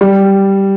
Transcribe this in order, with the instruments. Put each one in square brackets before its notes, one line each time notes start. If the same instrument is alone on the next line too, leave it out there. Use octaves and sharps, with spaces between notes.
[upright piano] G3